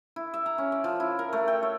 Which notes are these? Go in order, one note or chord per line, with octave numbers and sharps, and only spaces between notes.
E4
E5
A#5
C#4
D5
F3
E4
A#4
A3
G5
C#5